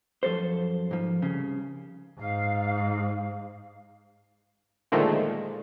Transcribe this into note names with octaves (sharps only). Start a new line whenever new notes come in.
F#2 F3 A4 C5
G#2 F3
C2 C#3
G#2 F5
A#2 D3 D#3 F3 G#3 A3